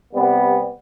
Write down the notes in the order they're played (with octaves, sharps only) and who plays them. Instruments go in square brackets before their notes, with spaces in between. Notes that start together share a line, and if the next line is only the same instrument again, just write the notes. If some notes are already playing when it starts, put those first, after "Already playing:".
[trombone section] C3 G3 B3